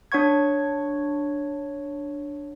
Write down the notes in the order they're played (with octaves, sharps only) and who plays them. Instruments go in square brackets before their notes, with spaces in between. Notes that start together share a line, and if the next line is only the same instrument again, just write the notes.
[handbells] D4 C#5 F#5 C#6 G#6